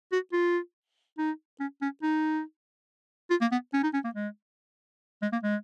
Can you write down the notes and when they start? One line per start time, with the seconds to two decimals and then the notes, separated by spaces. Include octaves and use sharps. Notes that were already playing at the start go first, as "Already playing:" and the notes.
0.12 F#4
0.33 F4
1.18 D#4
1.60 C#4
1.82 C#4
2.03 D#4
3.30 F4
3.41 A#3
3.52 B3
3.73 C#4
3.83 D#4
3.94 C#4
4.05 A#3
4.15 G#3
5.22 G#3
5.32 A#3
5.43 G#3